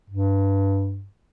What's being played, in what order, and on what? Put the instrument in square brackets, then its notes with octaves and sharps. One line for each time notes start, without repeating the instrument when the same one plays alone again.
[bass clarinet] G2